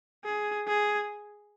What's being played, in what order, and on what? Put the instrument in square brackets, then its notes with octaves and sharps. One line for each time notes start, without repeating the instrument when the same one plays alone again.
[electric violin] G#4
G#4